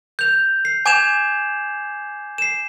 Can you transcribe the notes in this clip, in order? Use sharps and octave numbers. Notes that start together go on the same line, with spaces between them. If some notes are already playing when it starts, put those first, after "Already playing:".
G6 F7
C7
G#5 D6 G6 G#6 E7 F7
C7 E7